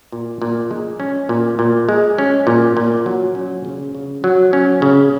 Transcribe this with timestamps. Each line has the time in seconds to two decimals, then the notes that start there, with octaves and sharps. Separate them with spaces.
0.12 A#2
0.42 A#2
0.71 G#3
1.00 C#4
1.29 A#2
1.59 A#2
1.89 G#3
2.18 C#4
2.47 A#2
2.77 A#2
3.06 F#3
3.35 C#4
3.65 C#3
3.95 C#3
4.24 F#3
4.53 C#4
4.82 C#3